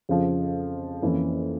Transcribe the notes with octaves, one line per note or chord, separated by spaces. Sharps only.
F2 C#3 F3
F2 E3 A#3 C#4